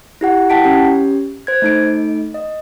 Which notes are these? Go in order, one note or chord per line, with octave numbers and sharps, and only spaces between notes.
E4 G4 F#5
E4 F#5 G5 A5 B6 D7
C#4 G4
C5 G#6
A3 D#4 D7
D#5